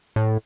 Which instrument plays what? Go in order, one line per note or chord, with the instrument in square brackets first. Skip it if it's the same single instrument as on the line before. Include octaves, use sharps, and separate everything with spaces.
[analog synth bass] A2